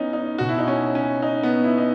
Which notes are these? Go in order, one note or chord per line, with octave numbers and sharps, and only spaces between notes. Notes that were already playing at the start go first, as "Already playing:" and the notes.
Already playing: E3 B3 C#4 D#4
D#4
B2 F#4
E4
D#4
C#4
C#4
D#4
B3
E4
D#4